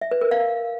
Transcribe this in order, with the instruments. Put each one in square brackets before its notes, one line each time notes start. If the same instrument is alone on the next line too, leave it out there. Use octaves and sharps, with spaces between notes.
[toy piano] E5
B4
A#4
F5